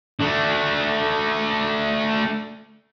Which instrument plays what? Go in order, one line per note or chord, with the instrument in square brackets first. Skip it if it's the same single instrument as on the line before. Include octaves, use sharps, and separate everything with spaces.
[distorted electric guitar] A3 D4